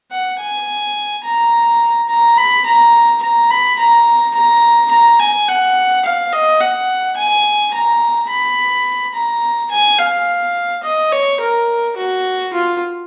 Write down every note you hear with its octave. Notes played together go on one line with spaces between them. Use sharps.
F#5
G#5
A#5
A#5
B5
A#5
A#5
B5
A#5
A#5
A#5
G#5
F#5
F5
D#5
F#5
G#5
A#5
B5
A#5
G#5
F5
D#5
C#5
A#4
F#4
F4